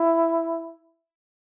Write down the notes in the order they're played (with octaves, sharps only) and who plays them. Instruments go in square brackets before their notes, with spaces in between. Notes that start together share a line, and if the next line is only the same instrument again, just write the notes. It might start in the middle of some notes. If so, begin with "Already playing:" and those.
Already playing: [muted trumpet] E4